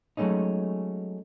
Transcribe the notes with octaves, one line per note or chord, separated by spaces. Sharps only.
F#3 G#3 A3 C#4 D#4